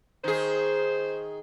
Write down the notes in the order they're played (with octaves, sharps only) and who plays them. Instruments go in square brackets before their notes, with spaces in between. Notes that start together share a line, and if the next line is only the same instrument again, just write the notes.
[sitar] D#3 G#4 [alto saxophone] C5